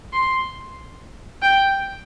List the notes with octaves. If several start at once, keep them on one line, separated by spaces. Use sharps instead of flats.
C6
G5